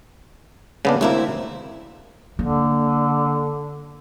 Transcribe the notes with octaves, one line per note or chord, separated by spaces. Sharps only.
C#3 A#3 B3 D4
D2 C3 A#3 C4 E4 E5
D3 A#3